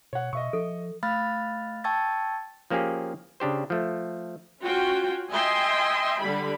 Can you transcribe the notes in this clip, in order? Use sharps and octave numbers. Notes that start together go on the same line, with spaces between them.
B2 C#5 F#5
B2 D#5 E5 C#6
F3 A4
A3 F5 B5 F6 F#6 A6
G5 A5 C#6 E6 G#6 A6
F3 A#3 C#4 G4 G#4
C#3 D4 G4 C5
F3 A3
C#4 F4 F#4 G5
D#5 E5 G5 G#5 C6
D3 G3 B5